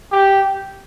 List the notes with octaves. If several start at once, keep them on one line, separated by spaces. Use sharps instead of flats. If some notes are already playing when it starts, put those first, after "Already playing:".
G4